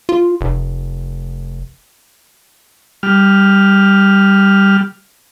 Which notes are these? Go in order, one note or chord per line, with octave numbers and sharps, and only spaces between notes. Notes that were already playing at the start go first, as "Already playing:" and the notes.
F4
F1
G3 F6